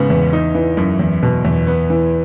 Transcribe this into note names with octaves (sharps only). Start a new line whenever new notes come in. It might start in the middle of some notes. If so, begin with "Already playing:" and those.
Already playing: G#2 C#3 B3
E2
D#4
E3
F#2
E2
B2
E2
B3
E3